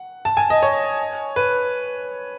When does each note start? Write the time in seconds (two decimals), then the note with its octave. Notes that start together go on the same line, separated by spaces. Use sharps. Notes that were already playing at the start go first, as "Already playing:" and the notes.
Already playing: F#5
0.25 A5
0.37 G#5
0.50 D#5
0.63 C#5
1.36 B4